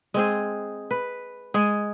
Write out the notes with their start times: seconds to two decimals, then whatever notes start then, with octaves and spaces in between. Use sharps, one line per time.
0.14 G#3 C4 G#4
0.91 B4
1.54 G#3 G#4